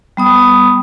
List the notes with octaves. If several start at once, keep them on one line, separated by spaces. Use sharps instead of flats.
G3 B3 D#6